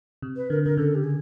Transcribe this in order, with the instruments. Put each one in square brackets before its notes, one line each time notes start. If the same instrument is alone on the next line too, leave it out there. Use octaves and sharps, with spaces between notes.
[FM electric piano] C3
[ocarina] B4
[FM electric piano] D3 [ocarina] A#4
[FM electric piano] D3 [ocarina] A#4
[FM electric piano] C#3 [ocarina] A4
[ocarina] G4
G#4